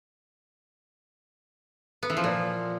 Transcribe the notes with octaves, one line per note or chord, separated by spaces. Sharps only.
B3
E3
F3
A#2